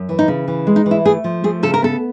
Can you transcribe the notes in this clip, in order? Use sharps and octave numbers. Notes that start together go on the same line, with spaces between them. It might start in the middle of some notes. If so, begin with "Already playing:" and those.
Already playing: F#2
E3
D#4
C#3
E3
G#3
D#4
E3
E4
A3 G#4
F3
A3 G#4
C#3 A4
A#4
B3 A4